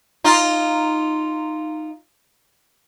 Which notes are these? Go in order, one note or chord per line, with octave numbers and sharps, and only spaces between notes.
D#4 F4